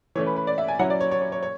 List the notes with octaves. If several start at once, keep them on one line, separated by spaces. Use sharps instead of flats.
E3 A3 C#4 C#5
B4
B4
D5
E5
G#5
F#3 C#4 E4 F#5
D5
C#5
C#5
C#5
C#5
C#5